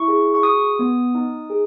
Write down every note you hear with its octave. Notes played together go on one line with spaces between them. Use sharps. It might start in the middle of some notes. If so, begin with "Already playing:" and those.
Already playing: E4 C#6
G#4
C#6
F#4 D#6
B3
D#4
G#4